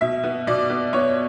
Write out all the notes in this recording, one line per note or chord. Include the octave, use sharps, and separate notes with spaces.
B2 E5
B3
B2 D5
B3
B3 C#5